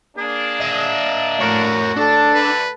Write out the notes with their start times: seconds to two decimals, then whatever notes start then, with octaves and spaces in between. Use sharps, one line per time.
0.17 A#3 D4 G#4
0.60 D#5 E5
1.40 A2 F#4 A#4 C#5
1.96 D#2 D4 A4
2.34 D2 D3 B4